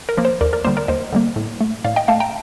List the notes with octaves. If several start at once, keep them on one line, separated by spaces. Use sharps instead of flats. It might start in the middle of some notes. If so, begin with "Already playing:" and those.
A#4
F3 A#3
C5
D#2 A#4 D5
A#4 D5
D3 G3 A#3 C5
A#4 D5
D#2 C5 D#5
D3 G3 A#3
A2
A3
A2 D5 F5
D#5 G5
A3 F5 A5
G5 A#5